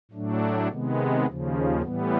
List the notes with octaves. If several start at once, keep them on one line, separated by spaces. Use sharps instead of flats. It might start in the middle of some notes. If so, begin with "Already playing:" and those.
A2 F#3 A3 D4
C3 D#3 G#3 B3
D#2 C#3 F3
A2 E3 G3 B3